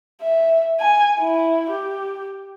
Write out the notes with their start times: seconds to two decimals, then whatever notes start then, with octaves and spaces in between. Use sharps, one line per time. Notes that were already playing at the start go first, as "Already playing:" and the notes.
0.22 E5
0.79 G#5
1.18 E4
1.70 G4